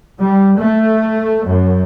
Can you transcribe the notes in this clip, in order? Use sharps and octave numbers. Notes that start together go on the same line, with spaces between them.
G3
A3
F#2